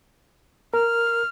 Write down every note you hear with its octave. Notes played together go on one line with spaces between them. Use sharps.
A#4 F6